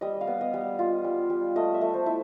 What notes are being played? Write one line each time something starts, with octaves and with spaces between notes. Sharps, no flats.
G3 D#5
F5
B3
D#5
G3
F4
G3
G3
A3 D#5
E5
A3
C5
E4